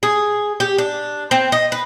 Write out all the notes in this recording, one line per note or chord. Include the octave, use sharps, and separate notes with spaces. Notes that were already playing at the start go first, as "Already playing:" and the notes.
G#4
G4
D4
C4
D#5
B4